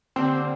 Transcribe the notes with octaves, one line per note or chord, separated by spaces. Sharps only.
D3 G3 A#3 C4 D4